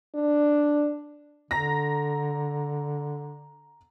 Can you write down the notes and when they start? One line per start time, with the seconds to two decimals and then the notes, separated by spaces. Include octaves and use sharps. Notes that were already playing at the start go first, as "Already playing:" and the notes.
0.15 D4
1.51 D3 A#5 A#6